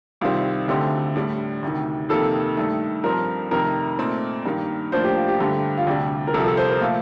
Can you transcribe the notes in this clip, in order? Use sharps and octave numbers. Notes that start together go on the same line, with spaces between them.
C2 C3 D#3 G3 C4 F4
D2 D3 A3 C4 D#4 G4
A2 G3 D4
D2 C3 D#3
F2 C3 D#3 A#3 A4
G2 D#3 A3
G2 F3 C4 A#4
F2 C3 D#3 A3 A#4
A#2 A3 C4 D#4
G2 D#3 A#3
A2 F3 A#3 D4 C5
G4
F4
G4
G2 D3 A3 G4
F4
D2 C3 G3 D4 G4
A#4
C2 C3 F3 A4
A4
C5
A#4
A#2 F3 A3 F5